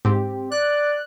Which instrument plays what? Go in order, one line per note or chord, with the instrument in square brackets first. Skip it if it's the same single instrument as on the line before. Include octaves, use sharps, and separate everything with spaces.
[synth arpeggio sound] G#2 [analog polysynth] C4 G4
[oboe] D5 [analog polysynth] F#6